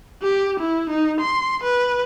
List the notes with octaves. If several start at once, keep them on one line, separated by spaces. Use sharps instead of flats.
G4
E4
D#4
C6
B4